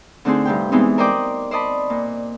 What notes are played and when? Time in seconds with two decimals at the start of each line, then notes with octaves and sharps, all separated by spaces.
0.25 D3 A3 C4 D#4 G#4 C5
0.45 G2 C3 G5
0.72 E3 G#3 B3 C4 D#4
0.98 A#4 C5 D5 D#5 G5 D6
1.51 C5 D5 D#5 A5 B5
1.90 A#2